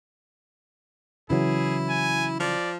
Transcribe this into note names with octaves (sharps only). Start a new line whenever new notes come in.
C#3 E3 F#3 E4 G#4
G#5
F3 D5